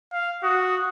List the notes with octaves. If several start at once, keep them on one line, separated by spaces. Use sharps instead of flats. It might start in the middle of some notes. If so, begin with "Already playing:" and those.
F5
F#4 D#6